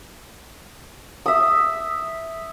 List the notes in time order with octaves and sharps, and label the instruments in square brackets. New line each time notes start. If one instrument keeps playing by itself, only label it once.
[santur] E5 D#6